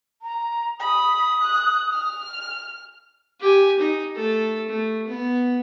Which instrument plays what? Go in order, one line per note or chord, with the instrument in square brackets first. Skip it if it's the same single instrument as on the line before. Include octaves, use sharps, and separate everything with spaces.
[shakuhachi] A#5
[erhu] B5 [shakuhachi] D#6
[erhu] F#6
F6
[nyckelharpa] G4 G#5
D#4
A3 A4
A3
B3